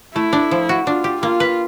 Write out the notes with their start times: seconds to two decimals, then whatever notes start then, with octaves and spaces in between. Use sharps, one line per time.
0.15 A3 E4
0.33 D4
0.51 F3
0.69 F#4
0.87 D4 F4
1.04 G4
1.22 A#3 F4
1.40 B4